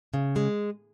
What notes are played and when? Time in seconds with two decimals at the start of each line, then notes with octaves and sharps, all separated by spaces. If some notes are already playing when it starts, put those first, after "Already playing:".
0.14 C#3
0.36 G#3